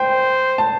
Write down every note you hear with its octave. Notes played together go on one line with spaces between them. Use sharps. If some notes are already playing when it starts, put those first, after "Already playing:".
Already playing: C5 G5
A5